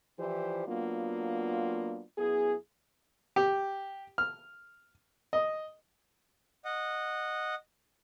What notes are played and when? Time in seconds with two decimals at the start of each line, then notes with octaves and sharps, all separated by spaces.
0.19 E3 F3 E4 G4 C5 D5
0.68 F#3 A#3 B3 D4 F4
2.18 F#2 B3 E4 G#4
3.36 G4
4.18 F6
5.33 D#5
6.65 D#5 F#5